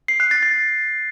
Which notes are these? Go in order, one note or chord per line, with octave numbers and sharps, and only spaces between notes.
C7
F#6
A6
A6